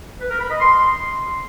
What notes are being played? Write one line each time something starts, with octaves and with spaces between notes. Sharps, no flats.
B4
A#4
B5
D#5
C6